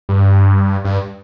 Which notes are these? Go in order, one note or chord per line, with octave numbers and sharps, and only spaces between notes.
G2
G2